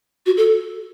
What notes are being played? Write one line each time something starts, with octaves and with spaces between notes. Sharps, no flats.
F#4
A4